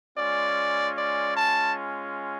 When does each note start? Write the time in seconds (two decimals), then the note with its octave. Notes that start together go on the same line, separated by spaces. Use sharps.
0.17 G#3 C#4 F4 D5
0.97 D5
1.37 A5